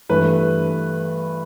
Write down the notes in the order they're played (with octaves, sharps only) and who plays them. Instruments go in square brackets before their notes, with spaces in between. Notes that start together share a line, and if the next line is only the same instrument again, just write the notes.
[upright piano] G2 E3 A3 B4